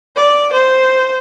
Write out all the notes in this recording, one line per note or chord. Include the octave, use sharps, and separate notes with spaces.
D5
C5